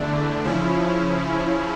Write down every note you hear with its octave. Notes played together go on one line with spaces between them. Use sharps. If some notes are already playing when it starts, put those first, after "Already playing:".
Already playing: E2 D3 A3 D4
C#3 F3 C#4 E4